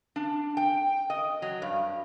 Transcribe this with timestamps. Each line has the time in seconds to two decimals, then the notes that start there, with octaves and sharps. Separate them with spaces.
0.16 D4
0.57 G5
1.10 D#5
1.42 F#3
1.62 G2